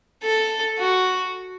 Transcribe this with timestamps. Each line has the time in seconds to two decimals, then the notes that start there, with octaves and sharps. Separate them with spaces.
0.23 A4
0.78 F#4